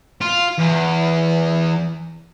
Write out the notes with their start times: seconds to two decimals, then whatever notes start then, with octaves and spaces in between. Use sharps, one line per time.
0.21 F4
0.59 E2